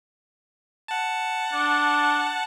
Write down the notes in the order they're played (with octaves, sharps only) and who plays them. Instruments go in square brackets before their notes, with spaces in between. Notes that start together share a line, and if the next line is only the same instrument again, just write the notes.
[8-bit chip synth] F#5 A5
[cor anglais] D4